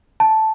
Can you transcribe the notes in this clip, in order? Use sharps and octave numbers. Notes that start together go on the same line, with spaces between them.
A5